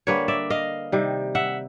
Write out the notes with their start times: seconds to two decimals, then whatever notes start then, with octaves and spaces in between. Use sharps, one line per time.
0.07 D3 G3 A#3 B4 C#5
0.28 D5 E5
0.50 D#5 F5
0.92 C3 D#3 G3
1.35 E5 F#5